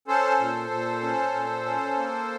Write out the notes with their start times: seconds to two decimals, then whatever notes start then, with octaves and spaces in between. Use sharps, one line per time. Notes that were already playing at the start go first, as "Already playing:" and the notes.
0.08 C#4 A4 C5
0.39 A#2
0.71 A#2
1.02 C#4
1.34 A#2
1.65 C#4
1.97 A#3